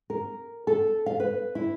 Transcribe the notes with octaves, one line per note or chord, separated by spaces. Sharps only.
A#4
A4
F5
B4
E4